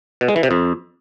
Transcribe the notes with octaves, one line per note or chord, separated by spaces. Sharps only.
B2
G#3
E3
C3
F2